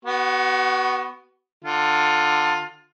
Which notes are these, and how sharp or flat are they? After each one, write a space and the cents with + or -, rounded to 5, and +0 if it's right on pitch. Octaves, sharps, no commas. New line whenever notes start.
B3 +0 F#4 +35 C#6 +0
D3 +20 F4 +20